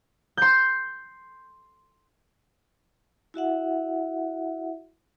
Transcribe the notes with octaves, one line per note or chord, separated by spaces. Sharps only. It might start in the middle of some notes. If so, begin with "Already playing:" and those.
C6 G6
E4 F#4 E5 F#5